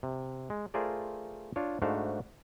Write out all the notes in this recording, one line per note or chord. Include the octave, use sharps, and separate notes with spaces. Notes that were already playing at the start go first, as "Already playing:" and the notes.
C3
G#3
A3 F4 G#4 A#4 C5 D5
D4 F4 C#5
G#2 A3 D4 F#4 C5 F5